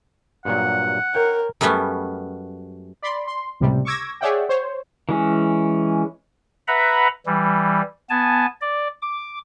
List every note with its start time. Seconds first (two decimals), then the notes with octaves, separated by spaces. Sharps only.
0.45 G2 A#2 F#3 F#5
1.15 A#4 C#5 G5
1.61 F#2 G3 A3 B3 C#4
3.03 D5 B5 C6
3.27 C6
3.60 C#2 A2 C3 G3
3.85 C#6 D6 E6 G#6 A#6
4.21 G#4 C#5 D5 E5 F#5 G5
4.49 C5 C#5
5.09 E3 G#3 C#4
6.68 B4 E5 F#5 A#5 B5
7.26 E3 G3
8.10 B3 G#5 A5
8.61 D5
9.02 D6